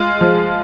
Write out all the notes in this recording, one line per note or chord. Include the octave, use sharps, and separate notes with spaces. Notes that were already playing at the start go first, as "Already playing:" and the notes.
Already playing: G#3 F4
F3